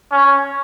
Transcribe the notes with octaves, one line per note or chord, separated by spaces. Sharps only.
C#4